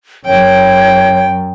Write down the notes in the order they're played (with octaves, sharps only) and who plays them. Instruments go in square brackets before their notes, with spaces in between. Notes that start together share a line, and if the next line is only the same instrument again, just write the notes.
[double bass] F#2 [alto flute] C#5 [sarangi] G5